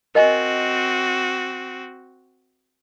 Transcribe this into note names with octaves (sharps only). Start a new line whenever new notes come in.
C4 F#4 A#4 D#5 G#5